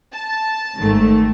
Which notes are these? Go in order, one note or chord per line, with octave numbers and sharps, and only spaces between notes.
A5
G#1 G#2 D#3 A3